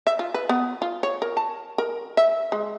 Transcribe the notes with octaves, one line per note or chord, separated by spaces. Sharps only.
E5
F4
B4
B3
F4
C#5
A#4
A5
A#4
E5
G#3